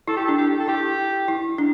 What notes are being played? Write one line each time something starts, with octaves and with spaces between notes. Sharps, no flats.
E4 A4
G4
A4
D4
G4
A4
E4 G4
E4
D4